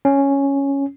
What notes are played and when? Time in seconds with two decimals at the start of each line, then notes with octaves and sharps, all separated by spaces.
0.05 C#4